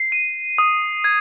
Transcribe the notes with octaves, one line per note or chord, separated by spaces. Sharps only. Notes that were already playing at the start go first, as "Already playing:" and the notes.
Already playing: C7
D#7
D#6
G#6